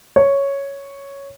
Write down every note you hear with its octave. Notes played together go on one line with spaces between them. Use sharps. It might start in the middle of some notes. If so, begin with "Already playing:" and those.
C#5